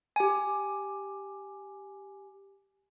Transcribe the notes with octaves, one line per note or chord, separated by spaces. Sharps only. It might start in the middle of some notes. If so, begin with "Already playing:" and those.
G4 G#5